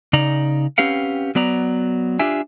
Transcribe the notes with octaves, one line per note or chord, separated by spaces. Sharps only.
C#3 D#4 D5 A#5
C4 C#4 G4 B4 F5 F#5
F#3 B3 D5 A#5
D4 F4 G4 E5 G#5